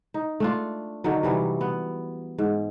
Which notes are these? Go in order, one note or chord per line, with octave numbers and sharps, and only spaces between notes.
D#4
A3 D4 F4
D3 D#3 F#3
C3 E3 F#3 G3
B3
G#2